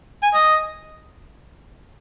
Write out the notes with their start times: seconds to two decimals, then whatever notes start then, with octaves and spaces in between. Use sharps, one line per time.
0.23 G#5
0.35 D#5